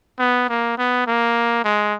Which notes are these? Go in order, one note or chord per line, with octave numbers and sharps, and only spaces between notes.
B3
A#3
B3
A#3
G#3